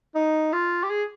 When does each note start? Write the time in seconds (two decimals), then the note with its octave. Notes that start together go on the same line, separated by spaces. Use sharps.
0.15 D#4
0.53 F4
0.83 G4
0.90 G#4